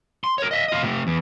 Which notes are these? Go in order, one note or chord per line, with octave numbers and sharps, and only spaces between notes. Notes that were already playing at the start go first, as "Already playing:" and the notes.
C6
A#4 C#5
D#5 E5
F4 D#5
C3 A3
E2